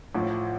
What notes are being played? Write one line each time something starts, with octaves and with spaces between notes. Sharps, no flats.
A1 A2 F3